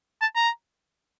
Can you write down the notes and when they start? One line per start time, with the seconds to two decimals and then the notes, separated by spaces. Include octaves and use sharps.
0.22 A5
0.36 A#5